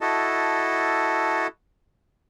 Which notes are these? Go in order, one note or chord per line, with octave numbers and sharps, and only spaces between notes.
E4 F#4 A4 D#5 A5